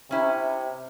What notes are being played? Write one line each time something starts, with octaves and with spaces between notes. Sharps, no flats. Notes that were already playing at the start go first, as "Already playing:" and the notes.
C3 C#4 E4